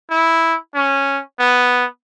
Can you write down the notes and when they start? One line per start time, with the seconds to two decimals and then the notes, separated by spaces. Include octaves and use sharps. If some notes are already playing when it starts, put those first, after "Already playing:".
0.10 E4
0.75 C#4
1.40 B3